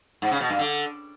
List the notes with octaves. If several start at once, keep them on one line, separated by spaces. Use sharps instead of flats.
G#2
C#3
B2
G2
D3